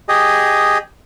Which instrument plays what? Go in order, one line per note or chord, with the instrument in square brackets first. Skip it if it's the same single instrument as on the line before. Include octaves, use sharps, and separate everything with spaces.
[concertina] G4 G#4 D#5